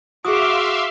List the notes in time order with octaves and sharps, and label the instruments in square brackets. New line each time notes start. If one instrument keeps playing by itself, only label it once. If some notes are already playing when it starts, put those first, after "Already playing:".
[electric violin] F#4 [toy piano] G#4 D#6 [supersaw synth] E5 F5 C6 [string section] D6